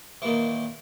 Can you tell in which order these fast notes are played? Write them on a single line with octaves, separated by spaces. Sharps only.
E3 A#2 D#3